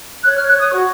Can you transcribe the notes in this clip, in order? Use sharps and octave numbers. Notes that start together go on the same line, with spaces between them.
C#5 F#6
F6
C#5
F#6
C#5 D#6
F#4 C#6